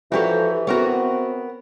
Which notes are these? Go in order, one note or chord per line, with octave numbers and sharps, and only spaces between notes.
E3 F3 F#4 G4 A4 A#4 C#5 D5
B3 C4 F#4 A#4 C#5